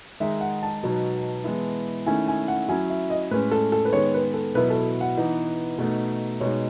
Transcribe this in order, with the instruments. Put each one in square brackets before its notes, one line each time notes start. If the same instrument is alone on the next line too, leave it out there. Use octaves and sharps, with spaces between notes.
[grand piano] D#3 G#3 D#4 [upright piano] E5
[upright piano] F#5
A5
[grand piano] B2 F#3 B3 D#4
E3 G#3 B3 E4
[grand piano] D#3 A3 C#4 E4 [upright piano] G#5
[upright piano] G#5
F#5
[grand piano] F#3 C#4 E4 [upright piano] G#5
[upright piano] E5
D#5
[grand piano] A2 G#3 C#4 [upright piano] B4
[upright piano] A4
A4
B4
[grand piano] D#3 G#3 B3 [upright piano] C#5
[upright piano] B4
A4
[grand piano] B2 F#3 B3 E4 [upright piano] B4
[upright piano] A4
F#5
[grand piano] E3 B3 D#4
B2 A3 D#4
[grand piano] B2 G#3 D#4 [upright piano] C#5